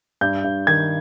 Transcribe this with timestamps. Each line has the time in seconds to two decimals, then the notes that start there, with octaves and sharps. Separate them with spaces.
0.21 G2 G6
0.44 G2
0.67 D#3 G#6